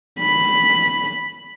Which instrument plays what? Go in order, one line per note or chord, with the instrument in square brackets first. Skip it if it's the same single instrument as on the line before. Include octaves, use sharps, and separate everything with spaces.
[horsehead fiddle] B5